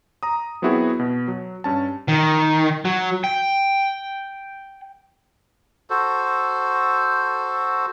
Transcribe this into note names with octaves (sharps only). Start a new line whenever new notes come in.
A#5 D#6
F#3 B3 C4 E4 F#4 G#4
B2
F#3
G2 C#4 A5
D#3
F#3
G5
F#4 A4 C5